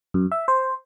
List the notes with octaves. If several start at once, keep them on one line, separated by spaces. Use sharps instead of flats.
F#2
E5
C5